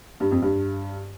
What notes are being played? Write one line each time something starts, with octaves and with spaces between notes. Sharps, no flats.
G2
F2
G2